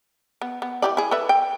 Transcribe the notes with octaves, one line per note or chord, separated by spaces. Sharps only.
B3
B3
E3 G4 D5
E4 G#4
A4 B4 E5
G5